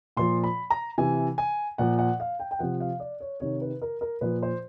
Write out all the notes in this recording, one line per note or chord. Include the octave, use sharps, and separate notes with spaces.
A#2 F3 C6
B5
A#5
C3 E3 G#5
G#5
A#2 F3 F#5
F#5
F5
G5
G5
C3 F3 F#5
F5
D5
C#5
C3 D#3 C#5
B4
A#4
A#4
A#2 F3 B4
C5